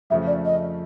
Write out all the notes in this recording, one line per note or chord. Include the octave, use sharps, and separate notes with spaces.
F2 C#3 F3 A3 E5
D5
D#5